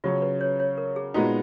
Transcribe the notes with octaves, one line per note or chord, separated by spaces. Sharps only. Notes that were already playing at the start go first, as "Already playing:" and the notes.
C#3 F#3 C#4 F4
B4
C#5
C#5
A#4
G#4
A#2 G#3 B3 D#4 F#4